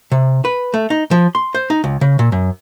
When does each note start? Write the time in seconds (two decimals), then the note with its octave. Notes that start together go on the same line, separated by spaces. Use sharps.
0.12 C3
0.45 B4
0.74 A3
0.90 D#4
1.11 F3
1.35 C6
1.55 C5
1.70 D#4
1.84 C#2
2.01 C#3
2.19 A#2
2.32 F#2